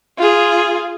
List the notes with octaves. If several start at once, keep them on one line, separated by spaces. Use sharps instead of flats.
F4 G#4